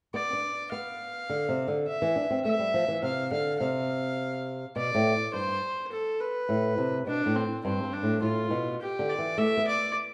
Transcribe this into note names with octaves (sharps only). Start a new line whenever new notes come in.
B3 D5
D4
B3 F5
D3
C3
D3
E5
E3
D4
C4
A3 E5
G3
F3
E3
C3 F5
D3 F5
C3 F5
B2 D5
A2
G2 C5
A4
B4
A2
C3
B2 D4
A2
C4
G2 C4
G2
D4
A2
A2 F4
B2
G4
D3
D5
E3
A3 E5
B3
D5